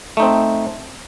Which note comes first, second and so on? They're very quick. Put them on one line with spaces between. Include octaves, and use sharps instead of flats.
A3 D#4 C4